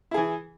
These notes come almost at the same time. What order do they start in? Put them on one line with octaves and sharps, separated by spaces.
E4 G#4 E3